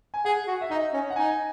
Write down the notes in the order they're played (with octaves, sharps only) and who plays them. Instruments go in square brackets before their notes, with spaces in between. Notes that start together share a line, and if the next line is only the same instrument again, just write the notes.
[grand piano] G#5
[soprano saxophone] G#4 [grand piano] F#5
[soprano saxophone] F#4
[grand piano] E5
[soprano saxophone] D#4 [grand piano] D#5
[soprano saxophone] C#4
[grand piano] F#5
[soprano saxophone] D#4 [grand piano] G#5